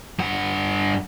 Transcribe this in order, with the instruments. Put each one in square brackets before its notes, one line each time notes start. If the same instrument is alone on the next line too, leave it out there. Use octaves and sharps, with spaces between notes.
[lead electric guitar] G2 F#5